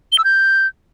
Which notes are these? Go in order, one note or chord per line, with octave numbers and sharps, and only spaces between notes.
G7
E6
G6